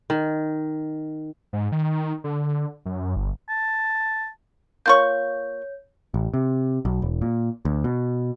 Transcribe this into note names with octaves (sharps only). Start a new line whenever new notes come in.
D#3
G#2
D#3
D3
F#2
G1
A5
A#3 F4 C#5 C#6 G6
A1
C3
B1
E1
A#2
D2
B2